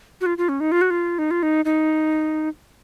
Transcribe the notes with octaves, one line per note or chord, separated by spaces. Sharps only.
F#4
F4
F4
C#4
D#4
F4
F#4
F4
D#4
F4
D#4
D#4